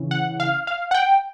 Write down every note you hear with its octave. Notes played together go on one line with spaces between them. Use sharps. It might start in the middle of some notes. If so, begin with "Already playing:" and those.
Already playing: C#3 E3
F#5
F5
F5
F#5
G5